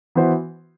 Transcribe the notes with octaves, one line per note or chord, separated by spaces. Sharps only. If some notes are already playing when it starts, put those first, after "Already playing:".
E3 B3 F#4 C5